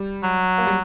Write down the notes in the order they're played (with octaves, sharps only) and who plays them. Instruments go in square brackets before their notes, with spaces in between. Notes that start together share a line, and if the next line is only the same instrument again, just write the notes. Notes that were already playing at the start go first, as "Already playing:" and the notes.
Already playing: [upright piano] G3
[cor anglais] F#3
[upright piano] A#3
G3